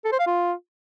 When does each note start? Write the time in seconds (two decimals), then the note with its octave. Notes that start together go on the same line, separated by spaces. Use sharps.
0.05 A4
0.12 C5
0.20 F5
0.27 F4